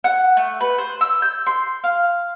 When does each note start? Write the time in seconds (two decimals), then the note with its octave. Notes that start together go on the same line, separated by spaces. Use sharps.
0.04 F#5
0.37 A3
0.61 B4
0.78 C5
1.01 E6
1.22 G6
1.46 C6
1.84 F5